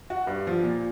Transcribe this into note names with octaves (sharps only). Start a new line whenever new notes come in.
F#4
G2
F3
A#2